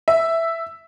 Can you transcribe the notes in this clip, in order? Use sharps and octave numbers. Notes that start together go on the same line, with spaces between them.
E5